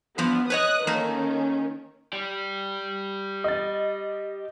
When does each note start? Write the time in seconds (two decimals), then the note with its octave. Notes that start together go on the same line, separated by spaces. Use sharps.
0.18 G2 F3 B3
0.50 B4 C#5 D#5 D#6 F#6
0.87 D#3 A3 A#3 C#4
2.13 G4 D5
3.44 D#5 A6